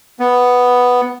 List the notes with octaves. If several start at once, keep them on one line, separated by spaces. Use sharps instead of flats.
B3